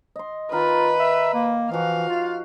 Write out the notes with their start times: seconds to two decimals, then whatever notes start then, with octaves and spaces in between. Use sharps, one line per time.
0.16 D#5 C6
0.52 D#3 F4 B4 F5 A#5
0.99 E5
1.34 A#3
1.71 E3 F3 F#4 F5
2.08 F4